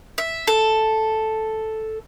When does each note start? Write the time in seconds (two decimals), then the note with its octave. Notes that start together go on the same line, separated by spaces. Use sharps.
0.18 E5
0.47 A4